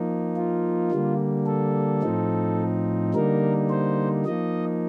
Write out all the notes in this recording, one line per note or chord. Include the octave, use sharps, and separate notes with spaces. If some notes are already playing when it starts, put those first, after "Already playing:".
Already playing: F3 A#3 D#4
F4
D3 G3 A#3
A4
A2 F3 C4 D#4
D3 G3 A#3 D#4 A#4
C5
F3 A#3 D#4 D#5